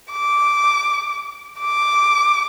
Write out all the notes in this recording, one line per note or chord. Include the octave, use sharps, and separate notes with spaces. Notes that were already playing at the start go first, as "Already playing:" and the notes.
D6
D6